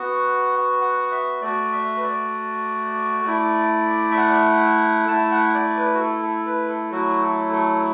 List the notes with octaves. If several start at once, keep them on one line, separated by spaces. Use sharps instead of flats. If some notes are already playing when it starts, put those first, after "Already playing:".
Already playing: B3 F#4 F#5
F#5
E5
A3 F#4 D5
E5
B4
D5
A3 E4
E5
F#5
A3 E4 A5
F#5
D5
B4
F#4
A4
A4
B4
A4
F#3 A3 E4 F#4
A4
A4